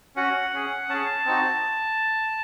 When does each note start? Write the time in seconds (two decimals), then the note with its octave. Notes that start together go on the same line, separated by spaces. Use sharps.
0.16 C#4 F#4 F#5
0.53 C#4 G#4
0.89 C#4 G#4 A5
1.26 C4 D#4 F#4